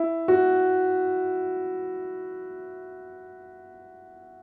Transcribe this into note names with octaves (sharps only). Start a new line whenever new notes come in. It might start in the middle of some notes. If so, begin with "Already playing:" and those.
Already playing: E4
F#4